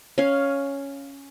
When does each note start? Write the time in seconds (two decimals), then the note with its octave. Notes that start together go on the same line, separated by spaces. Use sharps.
0.18 C#4 F5